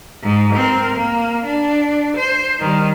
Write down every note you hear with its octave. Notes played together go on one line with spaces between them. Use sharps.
G#2
C4 A#4
A#3
D4
C5
D#3 G3